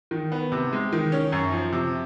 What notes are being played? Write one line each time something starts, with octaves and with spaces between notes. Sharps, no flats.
D#3
B3
C3
G#3
D#3
C#4
F#2
F3
C3